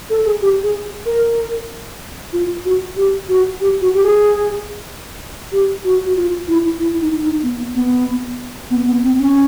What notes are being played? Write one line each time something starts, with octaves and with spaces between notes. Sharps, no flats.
A4
G#4
G4
G#4
A#4
F4
F#4
G4
F#4
G4
F#4
G4
G#4
G4
F#4
F#4
F4
E4
E4
D#4
D#4
B3
B3
B3
B3
C4
C#4